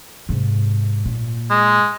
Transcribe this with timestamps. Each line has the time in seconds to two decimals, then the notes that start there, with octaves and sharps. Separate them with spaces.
0.29 G#2 C3
1.05 A#2
1.50 G#3